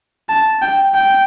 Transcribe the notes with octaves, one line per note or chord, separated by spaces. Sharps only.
A5
G5
G5